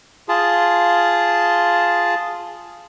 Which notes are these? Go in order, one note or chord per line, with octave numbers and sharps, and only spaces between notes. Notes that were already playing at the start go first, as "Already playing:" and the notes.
F4 G#4 A5